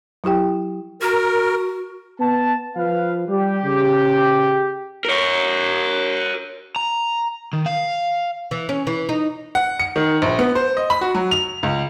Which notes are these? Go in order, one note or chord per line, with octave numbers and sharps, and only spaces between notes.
F#3 E4 G4 G5
F#4 A#4
B3 A5
F3 B4 F5
G3 G4
C#3
A#4 C#5
A#5
D#3
F5
E3
C#4
E3
D#4
F#5
C#7
D#3
A#1
B3
C5
D#5
B5
F#4
F#3
F7
C#2